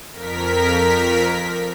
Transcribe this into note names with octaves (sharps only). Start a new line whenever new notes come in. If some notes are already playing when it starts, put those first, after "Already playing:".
F2 A#4 B6